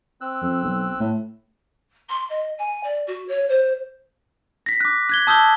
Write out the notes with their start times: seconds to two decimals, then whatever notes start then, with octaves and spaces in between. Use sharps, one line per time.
0.21 C4 E6 F#6
0.42 F2
0.64 B1
1.00 A2
2.09 C6
2.29 D#5
2.58 G#5
2.83 D5
3.06 F#4
3.28 C#5
3.49 C5
4.66 A#6 B6
4.80 D6 F#6
5.09 F#6 G#6 G7
5.27 A5 D#6 E6 G6 G7